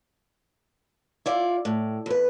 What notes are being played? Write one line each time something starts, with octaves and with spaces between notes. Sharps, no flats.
E4 F4 D5
A2
E2 B4